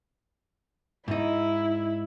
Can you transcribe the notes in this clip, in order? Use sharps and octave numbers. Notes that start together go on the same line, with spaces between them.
G#2 D#4 E4